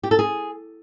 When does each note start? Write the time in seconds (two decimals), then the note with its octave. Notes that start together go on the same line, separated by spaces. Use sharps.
0.03 G4
0.11 A4
0.19 G#4